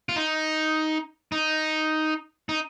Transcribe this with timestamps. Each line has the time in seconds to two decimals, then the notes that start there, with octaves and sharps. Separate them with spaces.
0.09 F4
0.16 D#4
1.32 D#4
2.49 D#4